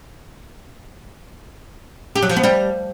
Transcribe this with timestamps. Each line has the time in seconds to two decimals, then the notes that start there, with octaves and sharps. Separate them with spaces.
2.15 G4
2.22 F#3
2.29 F3
2.36 B3
2.43 G3